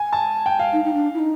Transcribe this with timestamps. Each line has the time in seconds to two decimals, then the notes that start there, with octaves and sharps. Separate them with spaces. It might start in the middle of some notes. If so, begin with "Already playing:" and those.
Already playing: G#5
0.13 A5
0.46 G5
0.59 F5
0.73 D#4
0.84 D#4
0.94 D4
1.14 E4
1.19 D#4